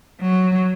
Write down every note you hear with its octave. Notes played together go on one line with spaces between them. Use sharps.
F#3